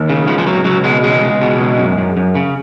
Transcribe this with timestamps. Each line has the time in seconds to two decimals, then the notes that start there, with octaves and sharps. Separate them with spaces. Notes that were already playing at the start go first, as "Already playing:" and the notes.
Already playing: D#2
0.09 C#3
0.27 C#2 F3
0.38 F3
0.46 C#2 F#3
0.65 C#2 F#3
0.84 B2 G#3
1.04 C#2 G#3
1.22 C#2
1.42 B2
1.60 C#2
1.79 F#2
1.98 F#2
2.17 F#2
2.35 C#3